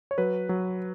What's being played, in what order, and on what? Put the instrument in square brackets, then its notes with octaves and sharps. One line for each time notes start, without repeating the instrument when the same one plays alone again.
[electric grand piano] C#5
F#3 B4
F#3